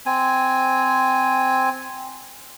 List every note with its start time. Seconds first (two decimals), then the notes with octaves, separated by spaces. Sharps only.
0.06 C4 G#5